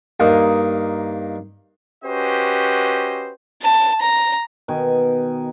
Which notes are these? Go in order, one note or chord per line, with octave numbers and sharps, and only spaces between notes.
G2 A#3 D#4 D#5
C#4 F#4 G4 B4 C5 D#5
A5
A#5
B2 D#3 G#5